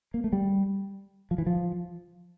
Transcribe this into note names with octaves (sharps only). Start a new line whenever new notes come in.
A#3
A3
G3
F3
E3
F3